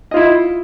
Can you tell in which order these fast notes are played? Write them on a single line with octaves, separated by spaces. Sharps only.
D#5 F4 E4